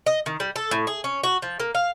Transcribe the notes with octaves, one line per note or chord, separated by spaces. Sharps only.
D#5
D#3
G3
A4
A2
G#4
C#4
F#4
F3
A#3
F5